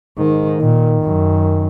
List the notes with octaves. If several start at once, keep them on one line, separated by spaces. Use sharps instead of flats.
G#2 D#3
A#2 D#3
F#2